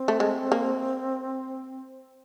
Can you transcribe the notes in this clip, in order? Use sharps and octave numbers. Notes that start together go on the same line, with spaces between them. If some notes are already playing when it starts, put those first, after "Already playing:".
Already playing: C4
A3
G#3
A#3